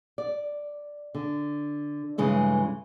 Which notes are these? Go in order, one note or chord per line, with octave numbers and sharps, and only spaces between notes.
D5
D3
G2 C#3 E3 G#3 A3